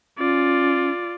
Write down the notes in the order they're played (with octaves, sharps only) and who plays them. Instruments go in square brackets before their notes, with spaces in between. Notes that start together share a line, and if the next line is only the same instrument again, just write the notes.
[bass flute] C#4 [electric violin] F4 D5